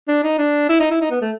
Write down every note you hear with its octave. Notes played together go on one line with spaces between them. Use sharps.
D4
D#4
D4
E4
D#4
E4
D#4
B3
A3